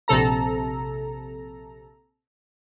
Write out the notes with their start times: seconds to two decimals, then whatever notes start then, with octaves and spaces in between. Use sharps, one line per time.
0.08 A#1 C3 A4 A#5